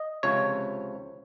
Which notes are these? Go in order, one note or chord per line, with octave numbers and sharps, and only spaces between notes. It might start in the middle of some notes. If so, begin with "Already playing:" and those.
Already playing: D#5
C#2 C3 F3 C#5